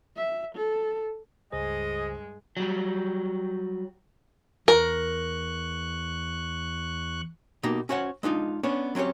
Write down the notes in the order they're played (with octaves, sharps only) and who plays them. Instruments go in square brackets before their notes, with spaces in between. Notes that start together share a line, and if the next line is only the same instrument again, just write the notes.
[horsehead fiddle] E5
A4
[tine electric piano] C#2 C#3 C5 [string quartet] G2 G#3 [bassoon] G#4 [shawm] D#5
[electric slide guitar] F#3 G3
[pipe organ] E2 C#6 F#6 [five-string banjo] A#4
[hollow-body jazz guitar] B2 A#3 D#4 G4
C#4 F#4 C5 C#5 F#5
G#3 D4 D#4 F4
B3 C#4 D4 C#5
F#3 C4 C#4 G4 C#5